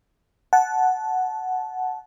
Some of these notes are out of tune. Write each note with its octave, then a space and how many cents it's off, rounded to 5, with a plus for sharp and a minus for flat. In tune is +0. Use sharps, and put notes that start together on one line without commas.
F#5 +0 A5 -15